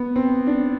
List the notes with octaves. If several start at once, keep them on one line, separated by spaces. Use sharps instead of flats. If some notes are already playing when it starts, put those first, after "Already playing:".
Already playing: B3
C4
D4